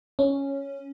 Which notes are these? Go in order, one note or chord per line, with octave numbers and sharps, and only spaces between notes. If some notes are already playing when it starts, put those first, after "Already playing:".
C#4